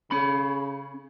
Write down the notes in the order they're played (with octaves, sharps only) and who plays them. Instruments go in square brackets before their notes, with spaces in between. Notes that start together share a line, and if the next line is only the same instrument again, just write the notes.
[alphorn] C#3 [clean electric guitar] C#4 B5